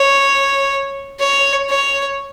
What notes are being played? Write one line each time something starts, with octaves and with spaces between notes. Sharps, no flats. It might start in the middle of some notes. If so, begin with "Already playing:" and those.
Already playing: C#5
C#5
C#5